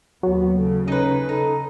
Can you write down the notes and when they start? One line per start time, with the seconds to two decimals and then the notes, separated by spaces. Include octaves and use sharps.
0.23 D#2 F#3 B3
0.58 C#3 A4
0.88 C#4 D#4 B4
1.29 D#4 A4